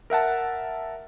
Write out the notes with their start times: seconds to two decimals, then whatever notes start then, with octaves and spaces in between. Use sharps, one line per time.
0.10 A#4 E5 F#5 A5